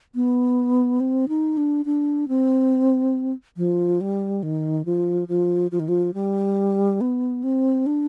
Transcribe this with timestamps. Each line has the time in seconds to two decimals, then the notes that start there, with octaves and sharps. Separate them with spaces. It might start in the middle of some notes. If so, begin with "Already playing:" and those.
0.15 B3
1.00 C4
1.29 D#4
1.57 D4
1.85 D4
2.28 C4
3.57 F3
4.01 G3
4.43 D#3
4.85 F3
5.28 F3
5.71 F3
5.80 D#3
5.88 F3
6.14 G3
7.01 B3
7.44 C4
7.86 D4